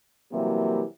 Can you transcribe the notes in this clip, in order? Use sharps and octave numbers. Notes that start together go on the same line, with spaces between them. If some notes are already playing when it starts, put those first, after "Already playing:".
C3 E3 F#3 G3 A#3